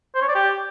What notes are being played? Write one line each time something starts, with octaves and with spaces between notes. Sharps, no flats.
C5
C#5
D5
G4